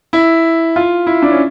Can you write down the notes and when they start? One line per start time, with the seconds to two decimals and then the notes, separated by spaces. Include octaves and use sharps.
0.13 E4
0.76 F4
1.07 E4
1.22 D4
1.31 C#4